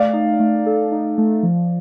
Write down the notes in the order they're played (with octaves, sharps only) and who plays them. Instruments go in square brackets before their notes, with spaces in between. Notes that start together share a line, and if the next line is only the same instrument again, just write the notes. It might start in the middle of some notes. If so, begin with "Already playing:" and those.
Already playing: [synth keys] A3 [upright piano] D5 F5
[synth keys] D#4
A3
A4
D#4
A3
F3